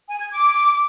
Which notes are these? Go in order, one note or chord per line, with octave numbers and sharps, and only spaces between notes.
G#5
G#6
D6